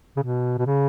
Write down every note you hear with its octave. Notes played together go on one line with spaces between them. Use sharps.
C#3
B2
B2
C#3